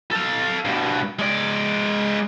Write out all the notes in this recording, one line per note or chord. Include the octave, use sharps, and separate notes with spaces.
A4 F5
G2 B2
G#3 D5